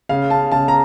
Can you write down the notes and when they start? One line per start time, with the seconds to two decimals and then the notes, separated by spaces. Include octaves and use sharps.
0.09 C#3 F5
0.30 A5
0.52 C#3 A5
0.68 A#5